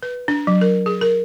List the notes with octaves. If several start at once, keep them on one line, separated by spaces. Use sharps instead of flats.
B4
D4
F#3
A#4
G#4
A#4